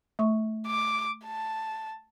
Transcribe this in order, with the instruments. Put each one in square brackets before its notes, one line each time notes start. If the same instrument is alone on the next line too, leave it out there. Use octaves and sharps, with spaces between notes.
[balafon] A3 C#6
[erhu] D6
A5